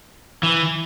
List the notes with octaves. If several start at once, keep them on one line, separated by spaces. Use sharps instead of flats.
E3